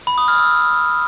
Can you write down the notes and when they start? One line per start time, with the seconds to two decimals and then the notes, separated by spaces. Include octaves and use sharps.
0.07 B5
0.18 D#6
0.28 F6
0.39 E6